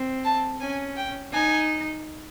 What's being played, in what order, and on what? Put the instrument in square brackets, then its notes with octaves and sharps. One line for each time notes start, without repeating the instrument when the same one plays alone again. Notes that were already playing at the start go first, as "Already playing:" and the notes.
Already playing: [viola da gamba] C4
[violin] A5
[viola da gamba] C#4 [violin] G#5
[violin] G5
[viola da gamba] D#4 [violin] G#5